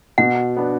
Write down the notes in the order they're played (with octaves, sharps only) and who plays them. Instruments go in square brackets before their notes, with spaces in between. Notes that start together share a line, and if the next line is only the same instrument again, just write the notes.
[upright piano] B2 [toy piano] F#5
[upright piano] B3 D4